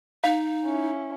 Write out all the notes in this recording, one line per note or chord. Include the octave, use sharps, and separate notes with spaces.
D#4 F5
C#4 E4